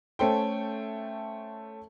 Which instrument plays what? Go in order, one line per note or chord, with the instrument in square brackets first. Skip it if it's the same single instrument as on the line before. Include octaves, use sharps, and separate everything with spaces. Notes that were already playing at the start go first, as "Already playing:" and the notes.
[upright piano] A3 C#4 A4 C5 G5